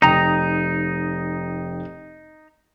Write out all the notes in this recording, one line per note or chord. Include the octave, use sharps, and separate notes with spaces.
F1 D#4 G5 A#5 D#6